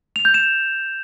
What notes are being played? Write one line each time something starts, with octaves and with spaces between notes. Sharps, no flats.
F7
G6
E7